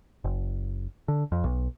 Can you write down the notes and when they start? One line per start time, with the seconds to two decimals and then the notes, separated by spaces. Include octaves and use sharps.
0.24 F#1
1.08 D3
1.32 F2
1.44 B1